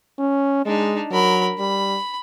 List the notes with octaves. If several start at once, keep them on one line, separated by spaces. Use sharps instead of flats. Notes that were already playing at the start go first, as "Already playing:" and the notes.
C#4
G#3 D4 D#4
F#3 A#4 B5
G3 B5